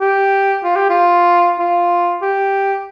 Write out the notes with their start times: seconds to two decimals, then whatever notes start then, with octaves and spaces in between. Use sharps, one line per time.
0.01 G4
0.64 F4
0.76 G4
0.90 F4
1.59 F4
2.22 G4